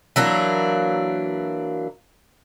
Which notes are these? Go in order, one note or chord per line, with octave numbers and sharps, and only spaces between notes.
E3 F#3 A#3 D4